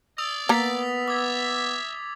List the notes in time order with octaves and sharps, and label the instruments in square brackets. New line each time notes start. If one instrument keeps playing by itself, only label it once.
[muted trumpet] D5 [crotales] D#6 E6 F7
[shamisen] A#3 A#5 [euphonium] B3 [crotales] A6 B6 F7
[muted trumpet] E5 [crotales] D6 G#6